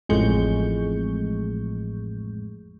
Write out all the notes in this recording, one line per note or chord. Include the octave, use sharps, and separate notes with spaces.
A1 F2 A2 G#3 C#6 G6